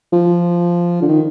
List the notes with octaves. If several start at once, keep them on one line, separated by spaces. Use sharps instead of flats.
F3
D3
D#3